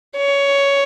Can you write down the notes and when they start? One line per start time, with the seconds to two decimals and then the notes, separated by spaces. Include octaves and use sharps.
0.16 C#5